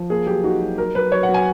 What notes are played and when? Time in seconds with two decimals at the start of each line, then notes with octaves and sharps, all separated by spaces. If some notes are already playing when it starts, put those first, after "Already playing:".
Already playing: F3
0.10 A#3 G#4
0.27 F#3 G4
0.44 D#4 F#4
0.61 F#3
0.78 F#3 A#4
0.95 F#3 B4
1.12 F#3 C#5
1.23 F#5
1.29 F#3
1.34 G#5